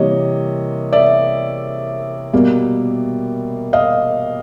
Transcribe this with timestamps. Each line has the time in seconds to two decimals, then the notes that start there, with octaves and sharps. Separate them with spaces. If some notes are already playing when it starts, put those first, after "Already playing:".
Already playing: C3 E3 G3 A#3 C#5 D#5
0.93 D5 E5
2.33 B2 G3 A#3
3.73 D#5 F5